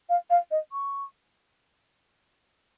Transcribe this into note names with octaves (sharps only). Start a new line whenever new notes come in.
F5
F5
D#5
C#6